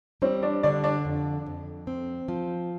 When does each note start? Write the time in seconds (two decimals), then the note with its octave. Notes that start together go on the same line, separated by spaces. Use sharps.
0.22 G3 C4 C5
0.43 D4 D5
0.63 D3 D4 D5
0.84 D4 D5
1.05 F2
1.46 F2
1.87 C4
2.28 F3